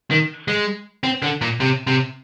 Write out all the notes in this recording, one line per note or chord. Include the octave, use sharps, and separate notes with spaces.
D#3
G#3
C4
D3
A#2
C3
C3